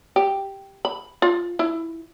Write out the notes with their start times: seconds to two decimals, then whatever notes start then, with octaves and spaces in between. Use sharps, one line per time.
0.16 G4
0.85 B5
1.22 F4
1.59 E4